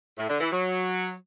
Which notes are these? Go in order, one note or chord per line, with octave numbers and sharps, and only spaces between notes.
A2
D3
E3
F#3